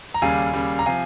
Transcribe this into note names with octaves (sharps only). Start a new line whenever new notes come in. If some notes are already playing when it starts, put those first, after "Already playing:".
A#5
D#2 C#3 G3 F5 G#5
D#2 C#3 G3
A#5
C3 F3 F5 G#5